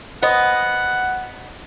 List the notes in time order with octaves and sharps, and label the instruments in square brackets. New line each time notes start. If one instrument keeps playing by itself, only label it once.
[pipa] B3 [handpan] C5 D#5 [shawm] F#5